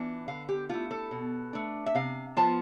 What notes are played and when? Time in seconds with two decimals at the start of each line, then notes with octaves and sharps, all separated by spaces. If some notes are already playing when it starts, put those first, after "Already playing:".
Already playing: E3 B3 D4 F4
0.28 D3 F5
0.49 G4
0.69 A3 E4 F4
0.91 A4
1.11 B2
1.53 A3 D4
1.86 E5
1.95 C3 F5
2.37 F3 B3 F4 A5